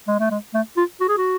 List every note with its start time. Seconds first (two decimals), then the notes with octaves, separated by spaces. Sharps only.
0.08 G#3
0.20 A3
0.31 G#3
0.54 A3
0.77 F4
1.00 F#4
1.08 G#4
1.17 F#4